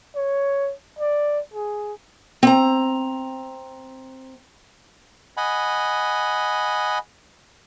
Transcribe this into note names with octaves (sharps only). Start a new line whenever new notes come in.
C#5
D5
G#4
C4 A#5
D#5 F#5 G#5 B5